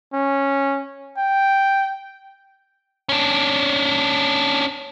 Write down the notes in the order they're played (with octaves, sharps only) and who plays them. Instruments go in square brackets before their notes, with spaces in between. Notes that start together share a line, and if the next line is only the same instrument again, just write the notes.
[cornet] C#4
G5
[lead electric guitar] C#4 D4